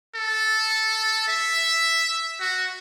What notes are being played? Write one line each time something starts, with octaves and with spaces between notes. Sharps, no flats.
A4
E5
F#4